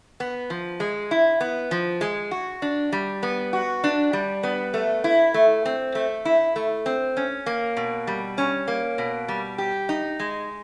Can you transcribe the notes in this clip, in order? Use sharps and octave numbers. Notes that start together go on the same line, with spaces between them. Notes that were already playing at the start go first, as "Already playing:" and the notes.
B3
F3
G#3
E4
B3
F3
G#3
F#4
D4
G3
B3
F#4
D4
G3
B3
A3
E4
A3
C4
A3
E4
A3
C4
C#4
A#3
B2
G3
C#4
A#3
B2
G3
G4
D#4
G#3